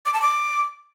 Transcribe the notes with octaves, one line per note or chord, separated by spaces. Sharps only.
D6
A5
D6